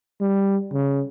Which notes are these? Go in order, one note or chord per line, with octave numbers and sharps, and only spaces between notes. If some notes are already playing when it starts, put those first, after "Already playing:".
G3
C#3